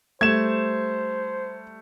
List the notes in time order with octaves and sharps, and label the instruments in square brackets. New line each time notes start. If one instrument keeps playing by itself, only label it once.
[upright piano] G3 A3 [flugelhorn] C5 [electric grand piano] G#6 E7